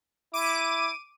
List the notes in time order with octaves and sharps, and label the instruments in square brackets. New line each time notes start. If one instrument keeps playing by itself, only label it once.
[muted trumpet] E4 [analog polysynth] D6 D#7